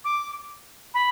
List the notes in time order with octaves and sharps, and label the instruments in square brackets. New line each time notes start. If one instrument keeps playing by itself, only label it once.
[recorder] D6
B5